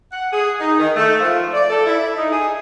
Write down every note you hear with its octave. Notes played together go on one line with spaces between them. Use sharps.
F#5
G#4
D#4
D#3
A3
F3
D5
A4
E4
D#4
G#4